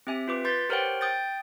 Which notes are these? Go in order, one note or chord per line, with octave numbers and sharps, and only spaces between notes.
C4 G4 E5 G#5
F4 B4 D6
B4 C6 G6 A6 B6
G4 A#4 C5 C#5 F#5 G5
G5 D#6 G6 A6